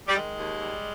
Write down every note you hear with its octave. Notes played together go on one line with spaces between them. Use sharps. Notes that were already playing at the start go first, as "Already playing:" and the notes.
G3
D#3 G#3
D#2
G3